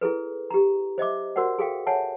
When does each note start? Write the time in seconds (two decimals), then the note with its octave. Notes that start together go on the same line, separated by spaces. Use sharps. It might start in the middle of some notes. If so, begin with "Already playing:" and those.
0.01 E4 G#4 A4 B4
0.50 G4 A#5
0.98 C5 D#5 E5 D6
1.36 F#4 A#4 C5 D5 F#5
1.59 G#4 A4 F5 G5
1.87 C#5 E5 F#5 G#5 A5